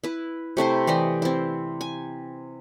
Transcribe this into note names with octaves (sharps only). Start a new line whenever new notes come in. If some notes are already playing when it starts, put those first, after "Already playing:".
E4 B4
C3 A3 E4 C5
E3 G4 D5 D#5
C4 E4
G#5